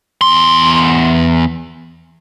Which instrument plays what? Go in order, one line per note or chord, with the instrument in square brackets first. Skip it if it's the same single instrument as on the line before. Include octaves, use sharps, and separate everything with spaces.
[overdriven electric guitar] E2 C6